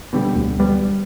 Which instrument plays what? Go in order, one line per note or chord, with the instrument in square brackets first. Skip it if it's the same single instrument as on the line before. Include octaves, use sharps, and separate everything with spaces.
[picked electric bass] B2 D3 G3
[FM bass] D2
[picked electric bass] G3 B3